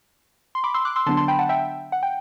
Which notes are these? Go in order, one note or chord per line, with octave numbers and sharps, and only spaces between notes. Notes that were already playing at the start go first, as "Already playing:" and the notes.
C6
B5 D6
C6 E6
D6 F#6
C6 E6
D3 F#3 B3 D4 A5 C6
A5 C6
G5 B5
F#5 A5
E5 G5
F#5
G5